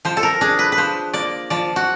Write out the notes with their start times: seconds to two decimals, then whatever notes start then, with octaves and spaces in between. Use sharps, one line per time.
0.05 F3 C5
0.17 A4
0.23 A#4
0.41 D4 G#4
0.59 B4
0.72 B4
0.77 F3 C5
1.14 A#3 D5
1.50 F3 D5
1.76 F#4